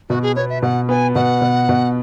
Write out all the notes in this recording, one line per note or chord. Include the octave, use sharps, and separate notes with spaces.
B2 F#4
G#4
B3 C#5
E5
B2 F#5
B3 G#5
B2 F#5
B2
B2